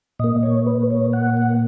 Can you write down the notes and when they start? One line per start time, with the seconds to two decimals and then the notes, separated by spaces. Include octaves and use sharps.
0.19 A#2 A#3 D#5
0.43 C#5
0.67 B4
0.90 C#5
1.13 F#5
1.37 F#5